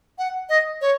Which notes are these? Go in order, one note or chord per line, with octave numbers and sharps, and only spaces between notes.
F#5
D#5
C#5